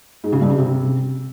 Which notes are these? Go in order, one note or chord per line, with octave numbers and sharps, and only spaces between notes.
G#2
C#3
G2
C#3
C3